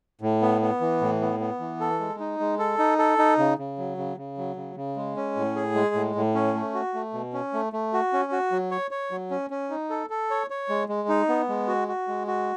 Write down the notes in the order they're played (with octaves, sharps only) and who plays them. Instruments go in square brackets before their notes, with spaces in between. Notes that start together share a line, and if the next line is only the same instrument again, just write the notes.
[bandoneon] A2
B3
B3
E3
A2
B3
B3
E3
A4
G#3
D#4
G#3
A4
D#4
A4
D#4
C#3
C#3
F#3
C#3
C#3
F#3
C#3
C#3
G#3
C#4
A2
G#4
G#3
A2
A2
C#4
A3
F#4
A3
B2
C#4
A3
A3
F#4
C#4
F#4
F#3
C#5
C#5
F#3
C#4
C#4
D#4
A4
A4
C#5
C#5
G#3
G#3
D#4
B3
G#3
F#4
F#4
G#3
F#4